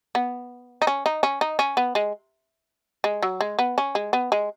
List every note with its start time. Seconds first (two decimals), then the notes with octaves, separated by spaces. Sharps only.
0.15 B3
0.82 D#4
0.87 C#4
1.06 D#4
1.23 C#4
1.41 D#4
1.59 C#4
1.77 B3
1.95 G#3
3.04 G#3
3.23 F#3
3.41 G#3
3.59 B3
3.78 C#4
3.95 G#3
4.13 B3
4.32 G#3